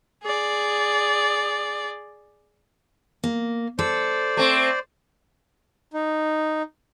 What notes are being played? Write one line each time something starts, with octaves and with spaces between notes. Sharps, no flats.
G#4 D5
A#3
A4 C5 D5
A3 C4
D#4